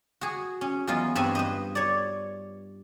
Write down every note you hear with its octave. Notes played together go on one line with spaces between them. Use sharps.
F#4 G#4
C#4
E2 F#3 B3 F4 D#5
G2 C4 B4 C#5 G#5
B4 C5 D#5
C#5 D5